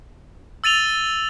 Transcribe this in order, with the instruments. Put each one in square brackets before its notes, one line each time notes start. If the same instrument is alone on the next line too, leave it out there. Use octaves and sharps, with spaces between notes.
[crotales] E6 A6 D#7 F7 G7